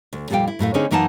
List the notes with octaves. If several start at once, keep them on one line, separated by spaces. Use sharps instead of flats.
D2
F2 A#2 G3 A4 F5 G5
E4
F#2 A2 A3 F5
D3 A#3 C4 C#4 D#4 G#4
F#2 E3 A#3 D#4 F#5 A5